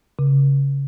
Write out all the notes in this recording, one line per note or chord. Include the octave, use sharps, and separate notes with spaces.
C#3